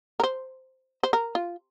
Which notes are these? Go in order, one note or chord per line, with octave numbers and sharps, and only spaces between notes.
A#4
C5
C5
A#4
F4